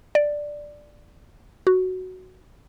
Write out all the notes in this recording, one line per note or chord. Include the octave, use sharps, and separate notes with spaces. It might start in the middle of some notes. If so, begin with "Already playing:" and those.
D5
F#4